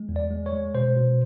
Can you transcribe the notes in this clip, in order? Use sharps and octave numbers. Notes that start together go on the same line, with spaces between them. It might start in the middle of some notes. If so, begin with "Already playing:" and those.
Already playing: G#3
E2
D5
G#3
C#5
G#3
B2 C5
B2